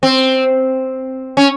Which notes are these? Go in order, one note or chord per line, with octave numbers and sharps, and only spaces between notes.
C4
C#4